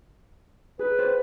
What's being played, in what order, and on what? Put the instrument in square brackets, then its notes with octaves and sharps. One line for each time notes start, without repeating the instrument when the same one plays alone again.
[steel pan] G#4 [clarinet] B4
[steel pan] C5